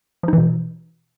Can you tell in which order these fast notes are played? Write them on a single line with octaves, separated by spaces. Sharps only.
F3 D#4 E3 B2